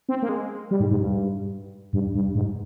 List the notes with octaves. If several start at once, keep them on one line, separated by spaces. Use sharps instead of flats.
C4
A#3
G#3
G3
G#2
G#2
G2
G2
G2
G#2